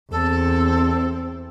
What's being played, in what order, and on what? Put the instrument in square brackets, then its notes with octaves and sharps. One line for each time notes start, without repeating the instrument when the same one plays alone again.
[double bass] E2 C4 [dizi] A4